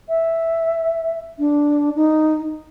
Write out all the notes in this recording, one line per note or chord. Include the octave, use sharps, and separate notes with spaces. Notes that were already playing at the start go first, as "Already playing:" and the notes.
E5
D4
D#4